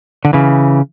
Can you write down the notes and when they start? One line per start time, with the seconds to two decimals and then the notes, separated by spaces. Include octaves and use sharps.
0.25 D3
0.33 C#3 E3